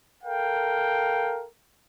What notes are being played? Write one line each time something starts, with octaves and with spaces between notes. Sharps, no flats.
A4 A#4 F5 G5